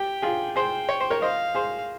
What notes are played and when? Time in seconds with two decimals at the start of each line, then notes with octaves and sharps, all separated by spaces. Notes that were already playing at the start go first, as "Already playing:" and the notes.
Already playing: G4 G5
0.22 F4 G#4
0.56 G#4 C5 G5
0.89 C#5
1.01 C5
1.10 A#4 C#5
1.22 C5 D#5 F5
1.55 G#4 C5